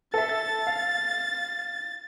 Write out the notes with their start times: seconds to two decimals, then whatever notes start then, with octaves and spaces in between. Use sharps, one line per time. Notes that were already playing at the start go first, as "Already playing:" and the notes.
0.14 A4 E5 A6
0.67 F5